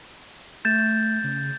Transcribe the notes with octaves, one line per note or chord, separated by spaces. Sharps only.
A3 G6 A6 E7
C#3